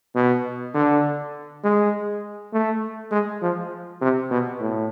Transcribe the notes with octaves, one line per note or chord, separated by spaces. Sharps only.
B2
D3
G#3
A3
G#3
F3
C3
B2
A2